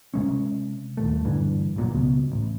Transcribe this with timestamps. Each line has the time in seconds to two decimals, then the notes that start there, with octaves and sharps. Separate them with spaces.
0.14 C3 G#3 C#4
0.97 D#1 D#2 A3
1.25 G2 D3 E3
1.76 B1 A#2 F#3
1.92 C#2 B2
2.32 A1